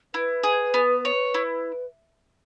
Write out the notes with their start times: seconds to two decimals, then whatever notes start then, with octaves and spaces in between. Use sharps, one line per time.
0.14 E4 B4
0.44 G#4
0.74 B3
1.05 C#5
1.34 E4